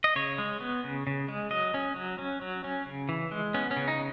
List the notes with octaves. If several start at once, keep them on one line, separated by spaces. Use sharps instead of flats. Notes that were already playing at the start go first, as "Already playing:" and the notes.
D#5
C#3 C#5
G#3
B3
C#3
C#3
G#3
F#3 D#5
C#4
F#3
C#4
F#3
C#4
C#3
E3
G#3
B3 C#4
C#4
C#3
D#4